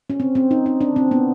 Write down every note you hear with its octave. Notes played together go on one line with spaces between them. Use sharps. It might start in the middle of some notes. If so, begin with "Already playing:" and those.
C#4
C4
C4
D#4
D#4
D4
C4
B3